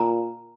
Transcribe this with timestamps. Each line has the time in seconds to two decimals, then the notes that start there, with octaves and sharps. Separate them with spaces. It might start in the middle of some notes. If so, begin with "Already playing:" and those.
Already playing: A#2 A#5